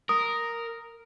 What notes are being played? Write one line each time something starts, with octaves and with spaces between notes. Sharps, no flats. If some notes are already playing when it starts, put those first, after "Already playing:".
A#4 D#6